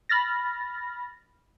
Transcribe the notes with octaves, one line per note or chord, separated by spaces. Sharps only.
B5 F6 A6 A#6